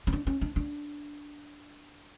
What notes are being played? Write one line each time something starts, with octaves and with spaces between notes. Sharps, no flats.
C#4
D4
C#4
D4
D4